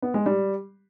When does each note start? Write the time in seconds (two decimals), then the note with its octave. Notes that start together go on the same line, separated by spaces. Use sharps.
0.02 B3
0.14 G#3
0.26 G3